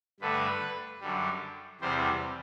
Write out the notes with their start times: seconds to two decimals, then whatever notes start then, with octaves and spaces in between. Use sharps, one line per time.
0.20 G2 D3 A3 B4
1.01 F#2 D3 G3
1.81 E2 C3 G3 C5